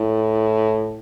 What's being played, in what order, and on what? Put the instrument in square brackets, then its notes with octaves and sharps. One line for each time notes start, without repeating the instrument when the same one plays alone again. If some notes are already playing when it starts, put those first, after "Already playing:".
Already playing: [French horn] A2